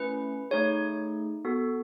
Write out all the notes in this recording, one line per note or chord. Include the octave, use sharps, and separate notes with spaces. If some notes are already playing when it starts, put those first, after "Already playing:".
Already playing: A3 C#4 E4 B4
A3 D#4 G#4 C#5
B3 F#4 A4